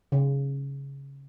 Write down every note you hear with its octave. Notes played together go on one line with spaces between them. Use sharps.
C#3